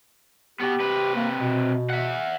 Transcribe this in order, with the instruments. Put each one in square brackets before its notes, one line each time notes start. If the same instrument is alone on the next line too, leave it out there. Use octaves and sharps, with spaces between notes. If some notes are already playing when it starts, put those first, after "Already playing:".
[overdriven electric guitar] B2 B3 [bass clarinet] G4
[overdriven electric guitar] C3 B4
[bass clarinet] A#3
B2
[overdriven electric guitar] E5 F#5